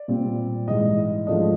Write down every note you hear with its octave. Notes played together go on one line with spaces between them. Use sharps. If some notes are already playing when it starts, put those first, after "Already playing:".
Already playing: D5
A#2 G3 C4
G#2 E3 G3 D#5
G#2 F3 A3 D4 D#5